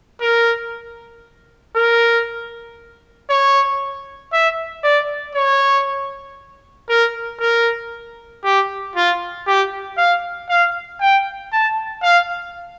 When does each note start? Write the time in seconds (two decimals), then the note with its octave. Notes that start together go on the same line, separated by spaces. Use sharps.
0.21 A#4
1.76 A#4
3.30 C#5
4.33 E5
4.83 D5
5.35 C#5
6.89 A#4
7.40 A#4
8.44 G4
8.96 F4
9.47 G4
9.97 F5
10.49 F5
11.00 G5
11.52 A5
12.03 F5